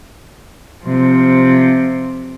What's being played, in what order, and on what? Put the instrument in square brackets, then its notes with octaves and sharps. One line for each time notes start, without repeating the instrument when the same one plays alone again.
[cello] C3 F3